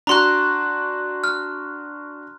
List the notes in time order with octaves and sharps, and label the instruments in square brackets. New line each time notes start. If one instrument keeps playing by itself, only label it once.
[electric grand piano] D4 F#4 [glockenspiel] A#5 C6 F#6
[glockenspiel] F6